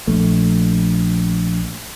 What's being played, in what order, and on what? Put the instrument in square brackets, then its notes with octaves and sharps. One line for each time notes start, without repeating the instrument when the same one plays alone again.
[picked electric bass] A#1 A3